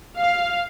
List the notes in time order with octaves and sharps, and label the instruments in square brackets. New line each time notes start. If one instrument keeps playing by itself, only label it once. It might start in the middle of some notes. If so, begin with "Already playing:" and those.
[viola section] F5